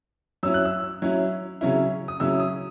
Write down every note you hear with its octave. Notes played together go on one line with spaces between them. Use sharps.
F#3 C#4 E4 E6
F#6
E6
F#3 C#4 E4
C#3 F#3 C#4 E4
D#6
C#3 F#3 C#4 E4 E6
D#6